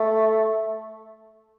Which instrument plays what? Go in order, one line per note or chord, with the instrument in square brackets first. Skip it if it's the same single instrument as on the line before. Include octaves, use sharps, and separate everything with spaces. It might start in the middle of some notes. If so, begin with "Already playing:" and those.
Already playing: [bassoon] A3